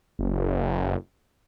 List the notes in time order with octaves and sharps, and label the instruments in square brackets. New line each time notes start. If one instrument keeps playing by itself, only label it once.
[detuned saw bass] F#1